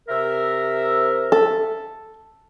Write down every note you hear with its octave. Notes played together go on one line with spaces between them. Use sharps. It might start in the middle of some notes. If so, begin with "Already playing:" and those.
C3 A#4 E5
A4